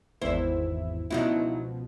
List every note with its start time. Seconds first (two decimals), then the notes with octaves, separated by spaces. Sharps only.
0.22 G#1 E2 E4 C5
1.10 C#2 B2 F3 F#3 D#4 E4